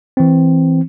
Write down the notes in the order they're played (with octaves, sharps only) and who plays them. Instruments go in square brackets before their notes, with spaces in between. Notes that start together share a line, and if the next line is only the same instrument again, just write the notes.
[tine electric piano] E3 C4